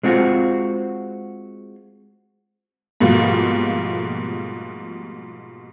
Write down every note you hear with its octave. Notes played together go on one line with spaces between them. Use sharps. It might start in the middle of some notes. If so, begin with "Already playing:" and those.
G#3 C4 F4 F#4
G#2 B2 F3 G3 A3 A#3